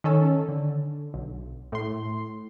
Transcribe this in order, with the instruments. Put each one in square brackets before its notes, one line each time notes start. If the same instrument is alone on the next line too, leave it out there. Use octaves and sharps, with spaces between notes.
[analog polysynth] D#3 C#4 A4
D3
B1
A2 C6